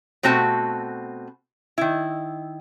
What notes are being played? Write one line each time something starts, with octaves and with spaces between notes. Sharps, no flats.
B2 A3 C4 F#4 A5
D#3 E4